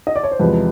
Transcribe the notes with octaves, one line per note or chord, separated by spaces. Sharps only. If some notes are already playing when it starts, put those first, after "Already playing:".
D#5
D5
C#5
C5
E2 C3 F3 G#3 B4